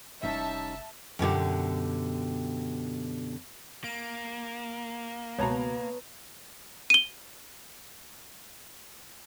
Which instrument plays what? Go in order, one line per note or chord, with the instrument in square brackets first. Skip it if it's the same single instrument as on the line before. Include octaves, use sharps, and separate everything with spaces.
[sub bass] F1 [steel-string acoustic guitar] G3 C#4 D#4 [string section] E5 A5
[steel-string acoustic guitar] F#2 B2 D3 G4
[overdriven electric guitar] A#3 [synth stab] D7
[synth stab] C#2 B2 [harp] B3 [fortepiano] C#5 A5 A#5
[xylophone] D#7 G7